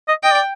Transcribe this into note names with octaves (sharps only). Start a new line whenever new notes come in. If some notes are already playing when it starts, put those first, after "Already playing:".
D#5
D#5 G5
D5